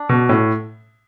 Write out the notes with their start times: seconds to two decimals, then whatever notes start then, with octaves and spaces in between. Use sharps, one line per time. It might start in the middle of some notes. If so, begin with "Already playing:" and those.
Already playing: D4
0.09 B2
0.29 A2